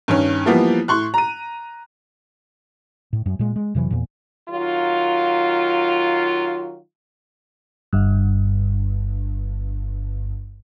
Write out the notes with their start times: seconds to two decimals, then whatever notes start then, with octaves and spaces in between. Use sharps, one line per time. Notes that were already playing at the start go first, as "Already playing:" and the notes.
0.08 G2 D#3 C#4
0.46 E3 F3 G3 A#3 B3
0.88 A2 C6 C#6 F#6
1.14 A#5 D#7
3.13 A2
3.26 F#2
3.39 A#2 G#3
3.56 G#3
3.75 F2 C3 E3 F#3
3.91 E2 A#2
4.49 D#3 F#3 F4
7.93 G1 G2